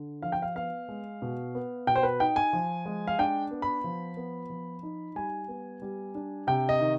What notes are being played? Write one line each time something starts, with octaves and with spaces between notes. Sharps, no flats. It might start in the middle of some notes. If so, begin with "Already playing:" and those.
Already playing: D3
F3 F5
G5
F5
B3 F5
G#3
B2
B3
B2 G5
C5
B4
D#4 G5
G#5
F3
G#3
F5
D4 G5
B3
B5
F3
B3
F3
D#4
G3 G#5
B3
G3
D4
C3 G5
D#5
D#3